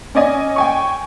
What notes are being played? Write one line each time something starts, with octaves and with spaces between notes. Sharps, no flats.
C#4 D5 D#5 G#5
G5 G#5 C#6